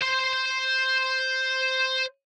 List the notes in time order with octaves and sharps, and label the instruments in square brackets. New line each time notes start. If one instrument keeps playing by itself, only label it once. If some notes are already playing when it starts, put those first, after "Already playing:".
[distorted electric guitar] C5 C6